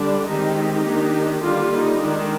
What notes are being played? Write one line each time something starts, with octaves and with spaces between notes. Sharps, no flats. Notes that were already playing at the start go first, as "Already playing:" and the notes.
Already playing: D3 G3 D4
D#3 G#3 C4 D#4 G4
D#3 A#3 D4
D3 G3 A#3 D4 F4
D#4
D#3 G#3 D4